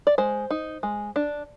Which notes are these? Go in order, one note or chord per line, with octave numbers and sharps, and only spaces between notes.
D5
G#3 C5
D#4
G#3
D4